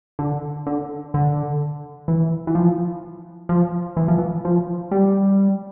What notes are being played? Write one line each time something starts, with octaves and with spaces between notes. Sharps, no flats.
D3
D3
D3
E3
E3
F3
F3
E3
F3
E3
F3
G3